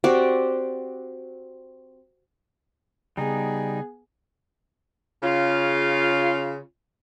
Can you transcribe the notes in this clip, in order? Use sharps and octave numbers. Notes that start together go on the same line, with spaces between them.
C4 F#4 G4 D5
C#3 G3 B3 D#4 G#4
C#3 F4